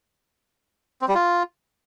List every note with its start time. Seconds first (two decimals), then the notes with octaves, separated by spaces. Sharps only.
1.01 C4
1.08 G3
1.15 F4